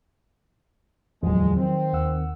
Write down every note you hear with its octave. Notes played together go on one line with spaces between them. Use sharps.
D1 E2 F3 F#3 G#3
D#3 C4
D#2 F#5 E6